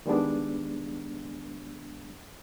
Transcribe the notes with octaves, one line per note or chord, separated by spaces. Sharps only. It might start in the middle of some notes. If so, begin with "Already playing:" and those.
D#3 G3 G#3 B3 D4